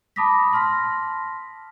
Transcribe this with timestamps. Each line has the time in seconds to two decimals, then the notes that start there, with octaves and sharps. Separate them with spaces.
0.16 A5 B5 D6 D#6 A#6 B6
0.52 A5 C6 F6 A#6 B6